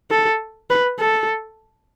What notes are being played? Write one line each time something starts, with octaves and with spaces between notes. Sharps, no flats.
A4
B4
A4